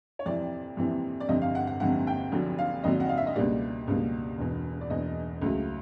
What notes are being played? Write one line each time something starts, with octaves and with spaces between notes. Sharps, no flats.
C#5
F2 C3 E3 D5
F2 C3 E3
D5
G1 F2 C3 D#5
F5
F#5
F#5
G1 F2 C3 F#5
G5
F1 F2 D3 F#3
F5
F1 F2 D3 F#3 D#5
F#5
F5
E5
D#5
C#2 B2 G3 A#3 D5
C#2 B2 G3 A#3
E1 E2 B2
D5
E1 E2 B2 D#5
C#2 C#3 F#3 A3